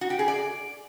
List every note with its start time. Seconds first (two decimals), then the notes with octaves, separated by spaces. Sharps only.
0.01 F#4
0.10 G4
0.19 G#4
0.28 D5